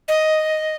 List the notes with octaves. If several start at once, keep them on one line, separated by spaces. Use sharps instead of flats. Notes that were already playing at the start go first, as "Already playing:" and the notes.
D#5